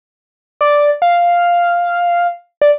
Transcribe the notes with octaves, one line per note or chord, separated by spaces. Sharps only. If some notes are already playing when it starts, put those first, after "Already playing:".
D5
F5
D5